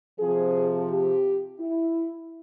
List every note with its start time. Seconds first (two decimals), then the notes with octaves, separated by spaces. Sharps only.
0.19 C3 F3 C4 G#4
0.89 G4
1.60 E4